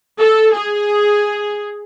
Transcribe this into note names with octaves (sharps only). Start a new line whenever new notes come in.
A4
G#4